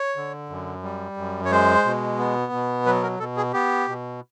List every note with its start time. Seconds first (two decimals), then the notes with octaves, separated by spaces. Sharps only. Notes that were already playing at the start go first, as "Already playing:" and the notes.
Already playing: C#5
0.16 D3
0.49 F#2
0.83 G3
1.17 F#2
1.45 C#5
1.51 G#3 C5
1.85 B2
2.19 B3
2.52 B2
2.86 F#3 B4
3.03 A#4
3.19 B2 A4
3.37 G#4
3.53 B3 G4
3.88 B2